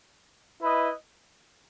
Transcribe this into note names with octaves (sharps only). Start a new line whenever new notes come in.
E4 B4 D#5